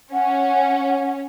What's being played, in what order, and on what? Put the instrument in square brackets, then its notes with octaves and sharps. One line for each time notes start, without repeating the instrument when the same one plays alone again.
[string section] C#4 [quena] F#5